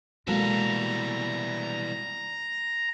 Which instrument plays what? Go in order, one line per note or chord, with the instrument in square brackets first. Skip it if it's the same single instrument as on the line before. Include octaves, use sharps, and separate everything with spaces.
[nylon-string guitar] B2 A#3 A4 [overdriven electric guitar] E3 G3 [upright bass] G#3 [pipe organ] A#5